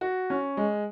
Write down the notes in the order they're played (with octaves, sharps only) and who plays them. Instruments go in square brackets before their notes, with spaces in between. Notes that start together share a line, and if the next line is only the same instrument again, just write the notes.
[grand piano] F#4
C#4
G#3